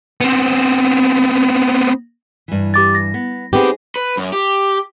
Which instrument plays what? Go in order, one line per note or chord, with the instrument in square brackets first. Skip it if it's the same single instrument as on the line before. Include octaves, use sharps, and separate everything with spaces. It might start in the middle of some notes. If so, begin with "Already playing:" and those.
[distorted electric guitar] B3 C4
[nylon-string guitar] G2 E3
[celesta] G4 D6 A6
A#6
[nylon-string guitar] B3
[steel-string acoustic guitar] B3 C4 G4 [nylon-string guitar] D#4 G#4
[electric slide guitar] B4
F#2
G4